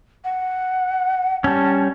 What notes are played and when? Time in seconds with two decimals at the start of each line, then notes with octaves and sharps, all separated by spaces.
0.24 F#5
1.44 G3 C#4 A5